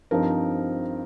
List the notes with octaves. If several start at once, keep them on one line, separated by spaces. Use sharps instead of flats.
G2 F3 C4 D#4 A#4